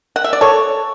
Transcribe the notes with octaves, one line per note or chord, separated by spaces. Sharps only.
F#5
E5
D5
A4 C#5